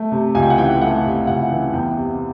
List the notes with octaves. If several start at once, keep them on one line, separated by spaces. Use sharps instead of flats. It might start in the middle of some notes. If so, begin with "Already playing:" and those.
Already playing: A3
C3
C#2 G#5
G5
F#5
E3 G5
A3 F#5
C3
C#2 F#5
E3
E2 G5
C3